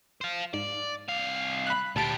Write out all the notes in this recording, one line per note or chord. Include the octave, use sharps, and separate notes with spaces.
C5 F5
G#2 D5
C2 F5
B5 F#6
D2 A#2 G4 A5 D7